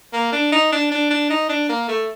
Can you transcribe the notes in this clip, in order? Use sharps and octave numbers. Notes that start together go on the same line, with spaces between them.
A#3
D4
D#4
D4
D4
D4
D#4
D4
A#3
A3